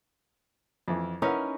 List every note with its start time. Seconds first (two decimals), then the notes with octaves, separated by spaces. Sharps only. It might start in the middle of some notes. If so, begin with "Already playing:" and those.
0.88 F2 E3
1.22 C#4 D#4 E4 A#4 B4 F#5